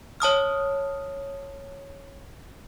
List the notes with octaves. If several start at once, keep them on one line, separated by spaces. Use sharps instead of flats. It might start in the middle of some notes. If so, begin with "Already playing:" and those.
C#5 A5 D#6 F6